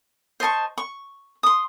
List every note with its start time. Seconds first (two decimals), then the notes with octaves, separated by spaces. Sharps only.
0.40 C5 D#5 A5 C#6
0.78 C#6
1.43 C6 D#6